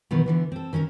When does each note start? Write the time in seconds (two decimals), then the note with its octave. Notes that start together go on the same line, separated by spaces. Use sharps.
0.11 B2 D#3 E3 F#3 B3
0.26 D3 E3 B3
0.52 C4 A4
0.73 D#3 C#4 A4 A#4